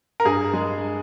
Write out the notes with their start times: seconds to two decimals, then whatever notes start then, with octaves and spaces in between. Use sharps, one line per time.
0.20 A#4
0.25 G2 G#4
0.53 G#3